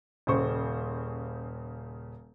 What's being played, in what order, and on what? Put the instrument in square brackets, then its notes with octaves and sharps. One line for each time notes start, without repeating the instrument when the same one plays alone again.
[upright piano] D#1 C#3 C5 C#6